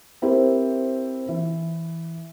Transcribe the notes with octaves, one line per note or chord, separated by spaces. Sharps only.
C4 E4 G4 A#4 C5
E3